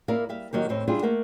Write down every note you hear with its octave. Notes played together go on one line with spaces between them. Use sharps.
A#3 E4 A#4 D5 F5
G3 E5 F5
D#3 F#3 A#3 G4
D#2 A2 C4 C#5
G3 D4 E4 F4 G4 G#4
A3 A#3 A#4 F#5